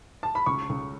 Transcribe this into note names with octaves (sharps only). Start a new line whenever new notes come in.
A5
B5
C#2 C#6
C#2